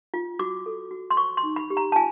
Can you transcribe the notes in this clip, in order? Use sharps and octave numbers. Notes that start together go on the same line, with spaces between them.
F4
F#4 D6
A4
F#4
C6
C5 C#6
C6
D#4
B5
G4
A#5
A5
F4 G#5